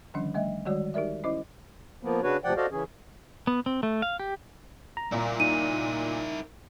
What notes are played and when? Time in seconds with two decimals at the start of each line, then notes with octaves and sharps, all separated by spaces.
0.14 D3 D#3 F3 G3 C#4 D4
0.34 G3 A3 D#5 E5
0.66 D#3 G3 G#3 F#4 C#5 D5
0.94 D#4 G4 A#4 D5 E5
1.24 C#4 E4 C5 D#5 D6
2.03 F3 A#3 B3
2.23 C#3 D4 F#4 B4 C#5
2.44 D2 C3 F3 D5 F#5 G5
2.56 F#4 A4 C5 D5 D#5 F5
2.72 C#3 E3 C#4 G#4
3.47 B3
3.66 C4
3.83 A3
4.02 F5
4.19 G4
4.97 A#5
5.12 A#2 E4 A#4
5.40 D#4 D#7